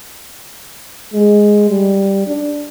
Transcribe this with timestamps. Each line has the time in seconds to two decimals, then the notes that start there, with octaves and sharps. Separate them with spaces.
1.14 G#3
1.70 G3
2.27 D4